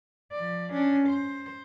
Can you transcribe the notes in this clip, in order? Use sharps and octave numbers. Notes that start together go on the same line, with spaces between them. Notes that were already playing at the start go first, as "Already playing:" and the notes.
F3 D5
C#4 D4
C5